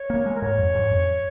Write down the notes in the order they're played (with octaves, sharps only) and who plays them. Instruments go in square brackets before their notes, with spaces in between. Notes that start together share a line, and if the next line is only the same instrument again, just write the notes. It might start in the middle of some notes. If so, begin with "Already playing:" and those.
Already playing: [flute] C#5
[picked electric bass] A#3
G#3
[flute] A#4
[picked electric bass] G#2 [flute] C#5
[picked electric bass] F2
G#2
F2